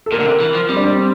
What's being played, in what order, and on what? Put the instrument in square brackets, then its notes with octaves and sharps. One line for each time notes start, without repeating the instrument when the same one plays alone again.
[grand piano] A4
[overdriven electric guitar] A#2 [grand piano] A#4
[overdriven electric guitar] D3
C3
E3
F3
[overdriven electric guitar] G3 [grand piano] C4
[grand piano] D4
C4